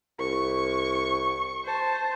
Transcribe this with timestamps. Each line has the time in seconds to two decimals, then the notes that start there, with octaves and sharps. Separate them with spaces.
0.19 C2 C#6
1.65 C5 A5